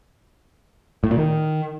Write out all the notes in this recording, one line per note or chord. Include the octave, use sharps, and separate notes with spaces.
A2
A#2
D#3